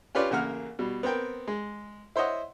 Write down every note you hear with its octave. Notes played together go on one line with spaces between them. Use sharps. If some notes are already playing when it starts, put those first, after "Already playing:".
C#4 F4 G4 B4 C#5 D5
A1 C#3 A#3 A#4 F#5 F6
B2 G3
B3 C4 A#4 G5
G#3
E4 C5 C#5 D#5 F#5